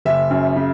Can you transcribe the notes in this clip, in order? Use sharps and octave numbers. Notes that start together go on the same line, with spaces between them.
F#1 E5
F#2
C#3